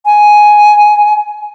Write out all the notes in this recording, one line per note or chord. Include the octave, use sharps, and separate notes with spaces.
G#5